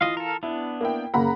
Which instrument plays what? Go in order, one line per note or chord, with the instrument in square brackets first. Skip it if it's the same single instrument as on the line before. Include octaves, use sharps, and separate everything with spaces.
[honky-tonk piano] E3 F4 [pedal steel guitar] D#5 F5
[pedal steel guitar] A4 A#4
[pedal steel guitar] B3 D4 [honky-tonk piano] E4
[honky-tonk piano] A#3 E4 G5
[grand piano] F#1 A#3 [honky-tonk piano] F#5 A#5 B5